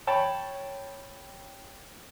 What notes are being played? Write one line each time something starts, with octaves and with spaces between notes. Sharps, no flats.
C#5 G5 A5 B5